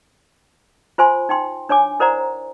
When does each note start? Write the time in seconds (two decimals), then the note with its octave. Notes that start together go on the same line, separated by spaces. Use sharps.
0.98 F4 C5 G#5 C6
1.29 D#4 G5 C6
1.69 D4 C#5 G#5 D6
2.00 E4 A#4 C5 D5 F#5 A#5